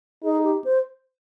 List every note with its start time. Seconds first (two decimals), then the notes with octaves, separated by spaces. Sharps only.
0.24 D#4 G#4
0.44 G4
0.64 C5